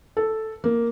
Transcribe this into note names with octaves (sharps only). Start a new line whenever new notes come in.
A4
A#3